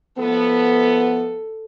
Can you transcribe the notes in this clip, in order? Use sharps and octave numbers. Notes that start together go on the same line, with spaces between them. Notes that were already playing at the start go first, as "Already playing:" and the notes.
F3 A3 B3 A4